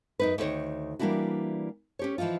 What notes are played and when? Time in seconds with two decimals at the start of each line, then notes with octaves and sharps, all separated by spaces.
0.19 F#2 D#4 B4
0.38 D2 D#3 B4 C#5
0.99 E3 G3 A#3 D4 E4 F#4
1.99 C#4 G4 C#5
2.18 E3 F3 B3 D#4 F4